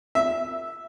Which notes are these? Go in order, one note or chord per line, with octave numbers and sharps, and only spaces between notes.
E5